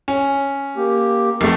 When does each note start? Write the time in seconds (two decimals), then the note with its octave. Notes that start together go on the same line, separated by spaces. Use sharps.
0.08 C#4
0.77 A#3 G4
1.41 F1 A3